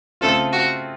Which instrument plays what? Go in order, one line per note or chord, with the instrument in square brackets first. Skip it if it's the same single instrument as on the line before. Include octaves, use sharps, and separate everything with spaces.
[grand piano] C#3 A3 C4 F4 [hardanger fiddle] A4
[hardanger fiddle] F#4